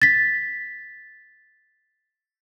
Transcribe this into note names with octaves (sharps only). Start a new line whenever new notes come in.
A6 B6